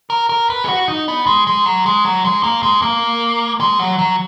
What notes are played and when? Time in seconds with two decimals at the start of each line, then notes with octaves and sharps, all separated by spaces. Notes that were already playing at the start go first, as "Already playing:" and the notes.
0.10 A#4
0.29 A#4
0.50 B4
0.64 G#4
0.68 F#4
0.88 D#4
1.08 B3
1.26 G#3
1.47 G#3
1.66 F#3
1.86 G#3
2.05 F#3
2.25 G#3
2.43 A#3
2.63 G#3
2.82 A#3
3.60 G#3
3.79 F#3
3.99 F#3